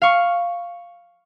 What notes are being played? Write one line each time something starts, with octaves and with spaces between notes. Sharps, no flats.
F5 C#6